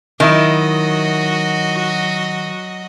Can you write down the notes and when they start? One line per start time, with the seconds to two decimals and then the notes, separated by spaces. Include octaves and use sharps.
0.20 D#3 F#3 E4 F#4 D#5